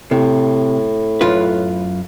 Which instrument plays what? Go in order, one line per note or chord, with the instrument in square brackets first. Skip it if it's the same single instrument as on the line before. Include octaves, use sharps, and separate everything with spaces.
[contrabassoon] A2 [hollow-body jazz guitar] C3
[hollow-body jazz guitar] F#2 F4 B4